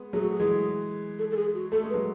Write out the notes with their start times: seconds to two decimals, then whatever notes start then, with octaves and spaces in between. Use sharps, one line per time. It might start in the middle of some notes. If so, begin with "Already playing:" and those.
Already playing: G#3 B3
0.13 F#3 A3 G#4
0.22 F#4
0.31 G#4
0.40 E3 G#3
1.19 A4
1.31 A4
1.36 G#4
1.55 F#4
1.72 A3 A4
1.83 G#3
1.90 B4
1.94 F#3 A3